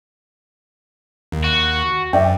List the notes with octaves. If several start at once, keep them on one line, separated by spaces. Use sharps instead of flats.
D#2
F#4
F#2 D5 E5 G5